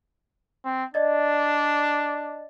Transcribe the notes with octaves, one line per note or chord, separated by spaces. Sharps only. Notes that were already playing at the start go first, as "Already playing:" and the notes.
C4
D4 D5 D#5 A6